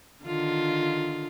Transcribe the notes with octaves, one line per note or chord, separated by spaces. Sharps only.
D3 D#3 F4